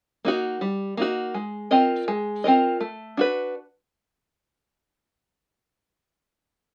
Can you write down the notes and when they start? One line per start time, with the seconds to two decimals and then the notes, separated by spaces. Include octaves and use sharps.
0.25 A#3 D#4 F#4
0.61 G3
0.97 A#3 D#4 F#4
1.34 G#3
1.71 C4 F4 A#4 D#5
2.08 G#3
2.44 C4 F4 A#4 D#5
2.80 A3
3.17 D4 F#4 B4